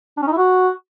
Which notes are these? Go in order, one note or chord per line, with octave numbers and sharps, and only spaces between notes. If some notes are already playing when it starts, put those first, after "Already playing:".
D4
C#4
D#4
E4
F#4